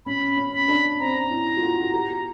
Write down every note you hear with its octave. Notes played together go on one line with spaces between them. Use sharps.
C#4 B5
C#4
B5
D4
C4 A#5
E4
F4
F#4
F#4
G4